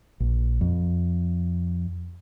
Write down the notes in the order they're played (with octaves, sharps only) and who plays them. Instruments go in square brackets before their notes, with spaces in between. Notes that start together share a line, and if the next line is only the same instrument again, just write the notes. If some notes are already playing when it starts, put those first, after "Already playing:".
[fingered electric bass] A#1
F2